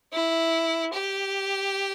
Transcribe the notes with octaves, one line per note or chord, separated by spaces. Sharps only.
E4
G4